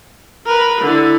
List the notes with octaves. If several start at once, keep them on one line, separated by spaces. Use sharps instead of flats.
A#4 B4
D3 E4